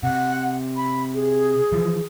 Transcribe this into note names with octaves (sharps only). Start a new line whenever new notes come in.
C3 F#5
B5
G#4
E3 F3